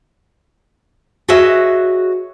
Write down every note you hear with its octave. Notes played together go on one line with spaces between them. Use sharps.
F#4 G#4 B4 C#5 D#5 E5